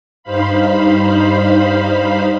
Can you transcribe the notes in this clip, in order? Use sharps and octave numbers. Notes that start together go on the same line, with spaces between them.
G2 G3 D#4 C5 F5 B5